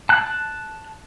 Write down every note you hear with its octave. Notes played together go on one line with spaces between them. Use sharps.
A5 F#6